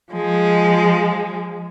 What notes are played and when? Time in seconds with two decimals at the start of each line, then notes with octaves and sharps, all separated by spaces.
0.12 F3 G#3